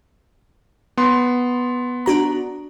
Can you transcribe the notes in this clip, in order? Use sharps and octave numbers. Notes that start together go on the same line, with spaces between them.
B3 C6
D4 F#4 A#5